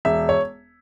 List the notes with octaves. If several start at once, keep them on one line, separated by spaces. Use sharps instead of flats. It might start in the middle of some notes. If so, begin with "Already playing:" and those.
E1 E5
C#5